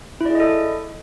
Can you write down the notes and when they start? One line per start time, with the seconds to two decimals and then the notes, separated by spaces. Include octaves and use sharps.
0.21 E4
0.25 D5
0.30 G#4
0.35 D#5
0.40 A4